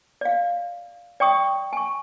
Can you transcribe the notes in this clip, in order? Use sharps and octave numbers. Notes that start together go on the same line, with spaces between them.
D5 F5
D5 G5 C#6 D#6
G#5 C#6